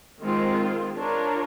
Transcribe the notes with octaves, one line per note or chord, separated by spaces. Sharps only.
D#3 G#3 C4 F4
D4 F4 A#4 C#5